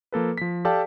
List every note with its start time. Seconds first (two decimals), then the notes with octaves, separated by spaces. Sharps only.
0.12 F3 A#3 A4 B4
0.38 F3 B6
0.65 G4 A4 D5 F5 G5 A5